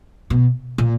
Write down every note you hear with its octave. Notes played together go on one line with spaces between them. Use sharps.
B2
A#2